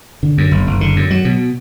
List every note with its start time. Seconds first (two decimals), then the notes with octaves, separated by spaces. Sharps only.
0.23 D3
0.38 F#2
0.52 F#1
0.67 F#1
0.81 D3
0.96 F#2
1.10 F#3
1.25 B2